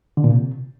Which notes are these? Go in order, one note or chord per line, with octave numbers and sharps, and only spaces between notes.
D3
A#2
C3